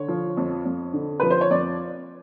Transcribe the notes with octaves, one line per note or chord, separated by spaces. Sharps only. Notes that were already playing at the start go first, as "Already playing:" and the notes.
Already playing: D3 C#5
F3
F2
F2
D3
F3 B4
C5
C#5
F2 D5